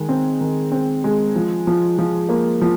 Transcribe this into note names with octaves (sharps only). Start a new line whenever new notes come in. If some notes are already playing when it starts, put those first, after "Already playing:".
Already playing: D#3 G#3
C4
D#3
C4
G#3
F3
F3
F3
A#3
F3